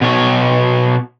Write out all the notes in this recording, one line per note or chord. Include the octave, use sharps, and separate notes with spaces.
B2 C#5